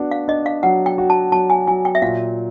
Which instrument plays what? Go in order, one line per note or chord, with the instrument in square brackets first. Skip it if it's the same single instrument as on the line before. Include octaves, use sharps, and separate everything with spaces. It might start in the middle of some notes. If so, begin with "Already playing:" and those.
Already playing: [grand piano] B3 D4 F#4
[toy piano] F5
[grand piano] D4 [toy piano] D#5
[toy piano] F5
[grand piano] F#3 [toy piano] F#5
[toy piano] G5
[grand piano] F#4
[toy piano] A5
[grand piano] F#3 [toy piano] A5
[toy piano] G#5
[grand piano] F#3 [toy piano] G#5
[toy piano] G5
E5
[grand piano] A#2 [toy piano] F5